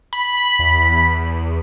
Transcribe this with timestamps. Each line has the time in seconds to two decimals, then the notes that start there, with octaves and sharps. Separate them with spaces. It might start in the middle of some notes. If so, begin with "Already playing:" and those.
0.13 B5
0.59 E2